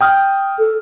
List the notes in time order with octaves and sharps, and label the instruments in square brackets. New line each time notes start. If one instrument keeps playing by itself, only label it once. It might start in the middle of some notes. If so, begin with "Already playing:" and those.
[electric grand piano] G5 D#6 F6
[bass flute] A4